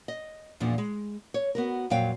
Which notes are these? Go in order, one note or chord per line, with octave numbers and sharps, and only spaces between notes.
D#5
E2 A#2 F3 D4
G#3
C#5
B3 F#4 A#4
F2 A#2 F#3 F5 G5